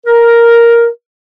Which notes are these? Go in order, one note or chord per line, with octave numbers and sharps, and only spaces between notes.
A#4